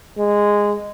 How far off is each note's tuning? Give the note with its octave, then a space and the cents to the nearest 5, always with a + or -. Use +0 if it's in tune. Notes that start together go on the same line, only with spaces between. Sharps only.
G#3 -10